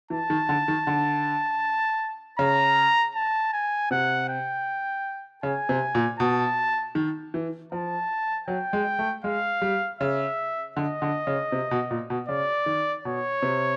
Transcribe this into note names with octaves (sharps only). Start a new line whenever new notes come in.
E3 A5
D#3
D3
D#3
D3
C#3 A#5
A5
G#5
C3 F#5
G5
C#3 G#5
C3
A#2
B2 A5
D#3
E3
F3 A5
F#3 G5
G#3
A3
G#3 F5
G3
C#3 E5
D3 D#5
D3
C#3
C3
B2
A#2
B2
C#3 D5
D#3
B2 C#5
C3